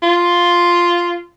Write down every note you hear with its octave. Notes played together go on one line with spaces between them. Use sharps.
F4